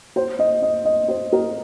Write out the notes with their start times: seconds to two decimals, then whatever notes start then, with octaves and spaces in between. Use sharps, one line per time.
0.16 C5
0.39 D#5
0.62 D#5
0.85 D#5
1.08 C5
1.33 A#4